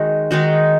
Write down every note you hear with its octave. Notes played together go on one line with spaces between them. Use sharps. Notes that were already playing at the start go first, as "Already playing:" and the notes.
Already playing: D#3 G#3 D#4 F#4
D#3 G#3 D#4 F#4